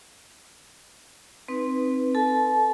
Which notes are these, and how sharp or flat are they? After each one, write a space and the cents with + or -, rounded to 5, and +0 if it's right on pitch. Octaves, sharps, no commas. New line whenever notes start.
C4 +0 D#4 +0 B4 +0
A4 +0 A5 -40